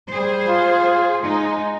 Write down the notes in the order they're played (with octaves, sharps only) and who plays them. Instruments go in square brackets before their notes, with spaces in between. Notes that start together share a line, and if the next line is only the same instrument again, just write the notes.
[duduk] G3 [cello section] G#4 C5
[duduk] F4
[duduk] G#3 [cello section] D#4